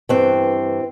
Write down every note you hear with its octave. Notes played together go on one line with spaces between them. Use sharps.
G2 E3 C4